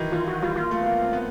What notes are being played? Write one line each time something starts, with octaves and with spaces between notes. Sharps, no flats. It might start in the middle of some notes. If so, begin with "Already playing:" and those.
Already playing: D#3 E3 F#3
E3 F4
F#3 F#4
G3 F4
A#3 F4
A3
B3
A#3
C4
B3